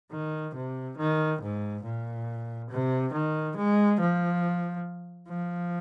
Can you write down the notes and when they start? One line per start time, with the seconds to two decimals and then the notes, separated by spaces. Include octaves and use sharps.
0.12 D#3
0.55 C3
0.97 D#3
1.41 G#2
1.84 A#2
2.70 C3
3.13 D#3
3.56 G#3
4.00 F3
5.29 F3